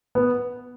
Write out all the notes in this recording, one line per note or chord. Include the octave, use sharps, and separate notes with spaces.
B3